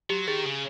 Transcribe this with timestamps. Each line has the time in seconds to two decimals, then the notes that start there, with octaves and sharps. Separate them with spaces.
0.10 F#3 G4
0.27 D#3 G#4
0.46 C#3